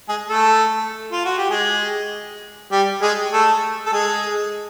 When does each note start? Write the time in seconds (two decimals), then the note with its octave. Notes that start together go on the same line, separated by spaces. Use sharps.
0.09 G#3 G#4
0.29 A3 A4
1.12 F4
1.25 F#4
1.38 G4
1.50 G#3 G#4
2.72 G3 G4
3.02 G#3 G#4
3.32 A3 A4
3.86 A4
3.93 G#3 G#4